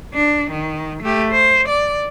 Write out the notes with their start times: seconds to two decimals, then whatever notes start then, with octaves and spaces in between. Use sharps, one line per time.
0.14 D4
0.51 D#3
1.03 A3 G4
1.32 C5
1.68 D5